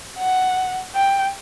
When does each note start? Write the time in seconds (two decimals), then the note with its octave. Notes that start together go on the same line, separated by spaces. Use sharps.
0.19 F#5
0.95 G5